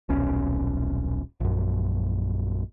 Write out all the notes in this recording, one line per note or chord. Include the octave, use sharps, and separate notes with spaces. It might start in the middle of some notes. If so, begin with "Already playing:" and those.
D#1 B1 C#4
A#1 F#2